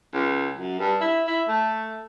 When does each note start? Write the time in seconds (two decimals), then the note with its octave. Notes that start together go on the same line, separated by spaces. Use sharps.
0.13 C#2
0.58 F#2
0.79 G2
1.01 E4
1.27 E4
1.48 A3